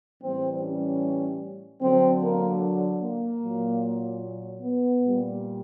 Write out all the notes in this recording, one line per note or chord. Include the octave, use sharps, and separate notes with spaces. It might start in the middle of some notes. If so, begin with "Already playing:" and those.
A2 E3 G3 C4
C#4
D3 F#3 C4
A#3
A#3
A#2 F#3
B3
A#2 G3